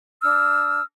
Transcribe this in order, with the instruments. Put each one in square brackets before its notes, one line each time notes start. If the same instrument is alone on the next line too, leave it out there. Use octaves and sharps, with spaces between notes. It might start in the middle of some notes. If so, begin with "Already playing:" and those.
[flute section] D4 E6 F6